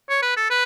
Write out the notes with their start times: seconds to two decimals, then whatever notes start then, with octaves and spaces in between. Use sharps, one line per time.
0.09 C#5
0.22 B4
0.37 A4
0.50 B4